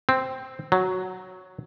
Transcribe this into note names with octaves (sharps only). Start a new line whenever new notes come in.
C4
F#3